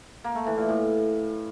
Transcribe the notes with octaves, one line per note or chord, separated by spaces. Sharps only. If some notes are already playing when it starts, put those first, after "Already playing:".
A#3
A3
E3
A#2
A2